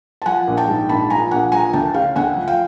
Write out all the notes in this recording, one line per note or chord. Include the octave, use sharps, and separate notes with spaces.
A5
F3 F#5 G#5
A#1
G5 A5
G#2
A#1 A5 B5
F3 G#5 A#5
A#1 F#5 G#5
F3 G#5 A#5
D2 G5 A5
C#3 F5 G5
D2 F#5 G#5
F3
F5 G5